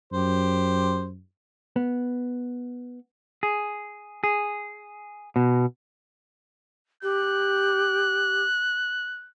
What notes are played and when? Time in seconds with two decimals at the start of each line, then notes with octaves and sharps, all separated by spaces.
0.13 F#2 G4 C5
1.76 B3
3.43 G#4
4.24 G#4
5.36 B2
7.03 G4 F#6